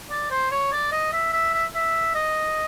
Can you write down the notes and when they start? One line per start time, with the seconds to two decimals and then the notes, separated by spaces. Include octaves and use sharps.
0.10 D5
0.31 C5
0.51 C#5
0.72 D5
0.92 D#5
1.13 E5
1.33 E5
1.54 E5
1.75 E5
2.15 D#5